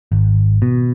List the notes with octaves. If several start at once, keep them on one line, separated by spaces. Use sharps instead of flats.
G#1
B2